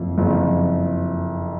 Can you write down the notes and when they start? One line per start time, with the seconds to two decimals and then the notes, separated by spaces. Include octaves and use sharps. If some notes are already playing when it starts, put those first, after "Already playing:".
Already playing: F#1 F2 F3
0.18 F#1 F2 F3